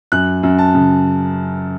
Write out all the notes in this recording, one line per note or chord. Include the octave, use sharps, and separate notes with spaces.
F#2 F#6
F#2
A5
C#3